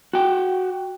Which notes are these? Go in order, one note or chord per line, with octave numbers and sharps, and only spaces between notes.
F#4 G5